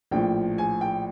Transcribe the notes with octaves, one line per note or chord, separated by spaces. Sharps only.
A#1 A2 F3 G5
G#5
G5